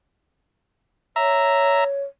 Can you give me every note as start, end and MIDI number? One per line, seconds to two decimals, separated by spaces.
1.16 2.03 73
1.16 1.84 76
1.16 1.84 82